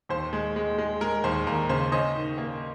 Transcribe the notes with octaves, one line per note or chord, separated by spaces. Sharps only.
D#2 C5
G#3
G#3
G#3
G#3 A#4
D#2 C5
D#2 A#4
C#3 C5
C#4 C5 D#5
D#3
A#3